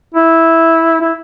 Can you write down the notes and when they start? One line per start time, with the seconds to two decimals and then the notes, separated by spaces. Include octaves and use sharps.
0.14 E4
1.01 E4